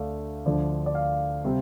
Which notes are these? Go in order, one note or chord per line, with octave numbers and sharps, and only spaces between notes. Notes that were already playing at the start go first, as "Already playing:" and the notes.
Already playing: D2 D3 A3 D5 F5
D2 D3 F3 D5
D5
F5
C3 G3 C4